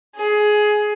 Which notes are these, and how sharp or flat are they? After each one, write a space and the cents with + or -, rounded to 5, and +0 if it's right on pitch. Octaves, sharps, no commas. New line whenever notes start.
G#4 +15